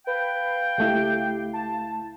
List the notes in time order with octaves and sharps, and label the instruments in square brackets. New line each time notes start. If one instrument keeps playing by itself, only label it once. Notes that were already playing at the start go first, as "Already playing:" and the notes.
[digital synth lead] B4 [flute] F5 [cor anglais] G5
[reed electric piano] C#2 A3 E4 [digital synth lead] G4
[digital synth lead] A5